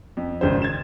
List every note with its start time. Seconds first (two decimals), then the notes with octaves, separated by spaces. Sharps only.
0.17 F2
0.41 G#1 C#3 D4 C5
0.62 G#6 A6 E7